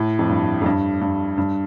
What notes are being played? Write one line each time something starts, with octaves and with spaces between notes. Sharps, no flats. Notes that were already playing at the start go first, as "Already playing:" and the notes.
Already playing: A2
F2
G2
F2
G2
G2
G2